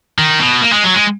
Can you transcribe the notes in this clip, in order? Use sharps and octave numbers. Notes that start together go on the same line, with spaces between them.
D#3
B2
A#3
G#3
F#3
G#3